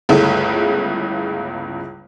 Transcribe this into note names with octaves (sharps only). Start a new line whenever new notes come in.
G1 C#2 C#3 A3 E4